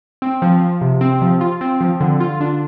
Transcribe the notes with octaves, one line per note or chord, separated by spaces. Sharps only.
C4
F3
F3
C3
C4
F3
F4
C4
F3
D3
F4
D4